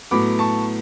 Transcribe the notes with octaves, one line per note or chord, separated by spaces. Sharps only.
A2 F#3 B3 B5 D6
A5 C#6